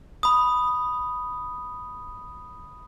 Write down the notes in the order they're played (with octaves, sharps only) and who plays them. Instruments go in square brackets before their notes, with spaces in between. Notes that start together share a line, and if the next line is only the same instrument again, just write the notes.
[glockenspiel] B5 D#6